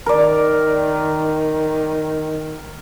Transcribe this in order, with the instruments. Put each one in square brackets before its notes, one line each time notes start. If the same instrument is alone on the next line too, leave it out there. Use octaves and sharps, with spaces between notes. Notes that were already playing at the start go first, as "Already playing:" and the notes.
[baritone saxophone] D#3 [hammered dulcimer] A#4 D5